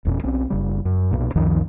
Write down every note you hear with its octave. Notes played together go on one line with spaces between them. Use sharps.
E1 E2 A#2 C#4
B1 C4 C#4
F#1 C#3 G3
F#2
B1 A#2
C#2 F#2 D#3 F3